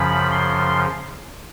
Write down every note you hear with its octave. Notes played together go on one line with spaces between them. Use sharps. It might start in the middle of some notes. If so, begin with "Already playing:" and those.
Already playing: F#2 C#3 F3 B5
C6